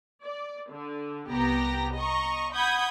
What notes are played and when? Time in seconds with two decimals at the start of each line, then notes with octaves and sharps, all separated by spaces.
0.23 D5
0.71 D3
1.29 C2 B3 G4 A#5 A#6
1.96 D#5 A#5 C#6
2.54 F#5 B5 D#6 G6 G#6